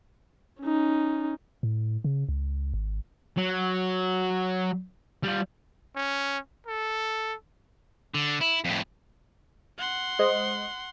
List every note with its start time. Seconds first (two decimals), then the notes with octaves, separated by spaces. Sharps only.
0.62 C#4 D#4
1.63 A2
2.04 C#3
2.29 C#2
2.74 G#1
3.37 F#3
5.24 G3 F4
5.95 C#4
6.67 A4
8.14 D3
8.41 E4
8.65 F2 A2
9.78 F#5 C6
10.19 G#3 C5 D#5